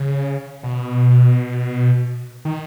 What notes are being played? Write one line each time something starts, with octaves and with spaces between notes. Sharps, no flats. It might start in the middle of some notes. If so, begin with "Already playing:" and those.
Already playing: C#3
B2
D#3